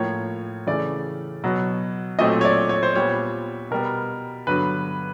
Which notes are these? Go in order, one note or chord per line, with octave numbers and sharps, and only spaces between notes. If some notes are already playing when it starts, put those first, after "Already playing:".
Already playing: A2 F3 A#3 C#5
C#3 E3 A3 D5
B2 F#3 B3
A#2 F#3 A3 C4 D#5
C#5
D5
C#5
C5
A#2 G3 B3 C#5
B2 G3 B3 A#4
G2 D3 F#3 B3 B4